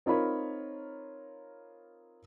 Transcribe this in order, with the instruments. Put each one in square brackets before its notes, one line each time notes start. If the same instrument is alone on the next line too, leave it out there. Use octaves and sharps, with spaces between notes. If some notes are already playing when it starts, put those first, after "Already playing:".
[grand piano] C4 D#4 F4 A#4 C#5 B5